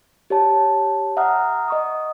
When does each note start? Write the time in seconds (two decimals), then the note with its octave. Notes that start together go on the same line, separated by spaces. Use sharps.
0.30 G4 C#5 A5
1.17 E5 F#5 A#5 D#6 F6
1.68 D#5 C#6 D#6